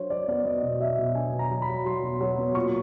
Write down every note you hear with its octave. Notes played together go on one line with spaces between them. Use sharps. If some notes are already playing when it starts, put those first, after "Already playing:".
Already playing: F#3 D4 C5 C#5
F#3 D5
B3 D5
B3 D#5
B2
F#3 E5
B2
D4 G#5
B2
A#5
F#3
B5
F#3
F#3 C6
B2
F#3
B3
A#2 C#6